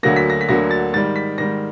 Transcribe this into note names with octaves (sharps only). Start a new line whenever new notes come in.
D2 D3 F#3 A#3 A#6
B6
A#6
B6
D2 D3 F#3 A#3 A#6
A6
G#2 D#3 G3 A6
B6
G#2 D#3 G3 A#6